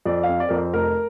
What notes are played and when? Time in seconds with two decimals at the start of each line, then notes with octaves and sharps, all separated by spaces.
0.06 F2 D5
0.23 F5
0.29 C4
0.40 D5
0.49 F2 A#4
0.57 C5
0.73 F1 A#4